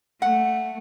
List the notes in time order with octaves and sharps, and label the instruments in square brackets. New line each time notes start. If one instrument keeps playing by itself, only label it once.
[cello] A3 [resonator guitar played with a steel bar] F#5